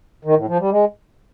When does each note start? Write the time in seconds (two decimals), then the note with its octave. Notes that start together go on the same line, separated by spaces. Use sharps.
0.25 D#3
0.36 A2
0.48 F3
0.59 G3
0.71 G#3